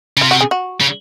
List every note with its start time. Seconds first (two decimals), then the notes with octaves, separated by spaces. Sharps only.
0.17 C#3
0.21 C3 F4
0.31 F#4
0.41 G#4
0.51 F#4
0.80 C#3